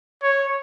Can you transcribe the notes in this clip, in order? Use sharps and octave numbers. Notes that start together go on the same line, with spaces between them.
C#5